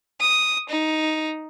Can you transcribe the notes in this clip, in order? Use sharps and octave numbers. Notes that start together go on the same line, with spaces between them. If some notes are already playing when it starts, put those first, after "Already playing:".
D#6
D#4